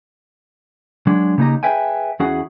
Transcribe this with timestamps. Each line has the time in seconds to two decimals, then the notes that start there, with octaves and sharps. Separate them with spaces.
1.07 F#3 G#3 D4
1.38 C#3 A#3 D#4 G4 D#5 A#5
1.63 G#4 A4 B4 E5 G5 G#5
2.19 E2 C#4 E4 F#4 G#4 F#5